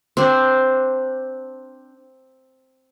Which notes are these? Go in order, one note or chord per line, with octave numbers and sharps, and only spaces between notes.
C4 D4